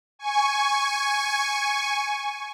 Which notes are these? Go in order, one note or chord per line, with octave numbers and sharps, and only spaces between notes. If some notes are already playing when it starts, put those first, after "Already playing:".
G#5 C#6